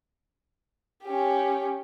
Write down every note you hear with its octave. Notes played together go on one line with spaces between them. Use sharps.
C#4 G4